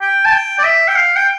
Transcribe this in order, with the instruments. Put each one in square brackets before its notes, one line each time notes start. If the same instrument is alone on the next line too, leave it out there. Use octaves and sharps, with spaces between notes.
[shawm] G5
A5
G5
D5
E5
G5
F5
G5